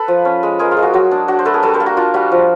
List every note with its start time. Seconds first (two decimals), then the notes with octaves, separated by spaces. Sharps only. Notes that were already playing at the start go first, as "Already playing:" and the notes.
Already playing: A4 B4
0.08 F3
0.25 C#4
0.43 G#3
0.59 G#3 G#4 A#4
0.71 F4
0.77 G#3
0.83 F#4
0.93 F#3 F#4
1.11 D4
1.28 D4 F#4
1.39 C5
1.45 A3 A4 B4
1.54 G#4 A#4
1.63 G3 A4 B4
1.74 A#4 C5
1.80 A#3
1.86 F#4
1.97 D4 F4
2.14 G3 F#4
2.32 F3